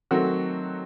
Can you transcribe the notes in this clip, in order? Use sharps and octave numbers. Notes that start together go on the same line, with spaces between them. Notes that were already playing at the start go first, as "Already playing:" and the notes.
D#3 F#3 A3 C4 F#4